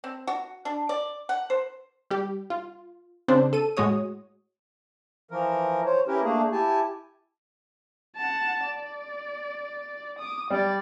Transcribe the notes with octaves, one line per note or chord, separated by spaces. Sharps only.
C4
F#4
D4
D5
F#5
C5
G3 G4
F4
C#3 C4 D4 C5
A4 D#7
A2 G#3 F#4 C#5 D#6
E3 F3 A#4
C5 C#5
C#4 E4 G4 A#4 B4
A3 A#3 D4 G#4
E4 G4 G#5 A5
F#5 A5
D5
D6 D#6
G3 D5